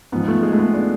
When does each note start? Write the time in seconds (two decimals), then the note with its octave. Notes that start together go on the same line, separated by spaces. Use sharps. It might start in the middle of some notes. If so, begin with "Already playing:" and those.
0.12 G#2 F3 B3
0.28 A3
0.43 G#3
0.53 A3
0.59 B3
0.74 D4